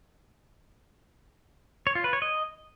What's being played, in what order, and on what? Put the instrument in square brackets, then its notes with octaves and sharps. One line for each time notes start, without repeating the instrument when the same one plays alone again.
[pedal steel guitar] C#5
F4
B4
C#5
D#5